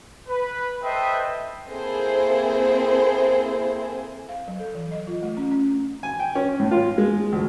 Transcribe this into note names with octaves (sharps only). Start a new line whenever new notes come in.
B4
A4 B4 C5 D#5 E5 G5
A#3 C4 E4 G#4 A4 C5
F5
F#3
A4
E3
D#5
F4
A3
C#4
C#4
G#5
G5
C#4
A2
F4
G#3
D2